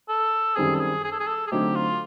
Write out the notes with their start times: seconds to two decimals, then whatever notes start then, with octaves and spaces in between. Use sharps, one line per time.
0.09 A4
0.56 F#2 D#3 G3 C4 G#4
0.75 A4
0.80 G#4
1.04 G#4
1.12 A4
1.19 G#4
1.27 A4
1.47 G#4
1.51 D3 F#3 A3 C4 D#4 G4
1.75 F4